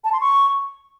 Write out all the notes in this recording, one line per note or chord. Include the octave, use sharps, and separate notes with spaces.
A5
C6
C#6